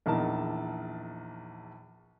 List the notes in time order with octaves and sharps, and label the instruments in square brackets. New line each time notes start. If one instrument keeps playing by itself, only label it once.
[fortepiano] A#1 E2 D#4 A#4 A5